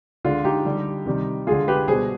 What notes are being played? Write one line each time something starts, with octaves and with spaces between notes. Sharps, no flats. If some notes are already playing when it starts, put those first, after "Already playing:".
D3 G#3 D4 F4
D#4 G4
D3 G3
C3 D#3 G3
D3 G#3 F4 G#4
G4 B4
B2 G3 G#4 C5